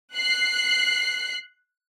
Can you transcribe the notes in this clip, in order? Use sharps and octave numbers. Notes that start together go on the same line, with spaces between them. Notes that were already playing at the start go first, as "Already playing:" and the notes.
F#6 C7